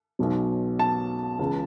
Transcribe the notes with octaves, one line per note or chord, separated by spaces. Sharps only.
B1 B2 F#3
A5
C#2 C#3 E3